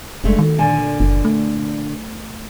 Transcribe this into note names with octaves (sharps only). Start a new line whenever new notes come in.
F1 G2 G#3 A3
D#3 F#4
A#2 D3 G#5
F#1
A3